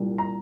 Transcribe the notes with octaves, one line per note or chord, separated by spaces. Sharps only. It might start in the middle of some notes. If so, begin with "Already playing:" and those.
Already playing: C2 A#2 G3
A#5